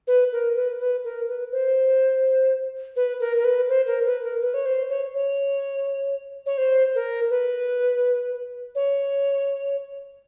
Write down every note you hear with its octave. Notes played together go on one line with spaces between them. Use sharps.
B4
A#4
B4
B4
A#4
B4
C5
B4
A#4
A#4
B4
C5
A#4
B4
A#4
B4
C#5
C5
C#5
C#5
C#5
C5
A#4
B4
C#5